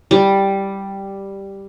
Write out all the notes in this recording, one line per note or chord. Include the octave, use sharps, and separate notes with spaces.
G3